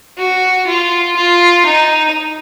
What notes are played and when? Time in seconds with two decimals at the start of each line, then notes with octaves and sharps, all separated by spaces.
0.18 F#4
0.67 F4
1.16 F4
1.66 D#4